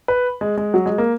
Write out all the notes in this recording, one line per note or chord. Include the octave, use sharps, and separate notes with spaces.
B4
G#3
G#3
F#3
G#3
A#3